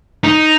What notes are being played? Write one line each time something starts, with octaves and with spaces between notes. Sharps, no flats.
D#4